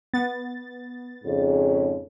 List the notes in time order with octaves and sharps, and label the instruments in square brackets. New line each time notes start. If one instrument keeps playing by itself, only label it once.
[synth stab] B3 A6
[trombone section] F2 G#2 C#3